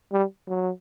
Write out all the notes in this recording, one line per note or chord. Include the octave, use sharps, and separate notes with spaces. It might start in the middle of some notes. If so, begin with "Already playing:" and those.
G3
F#3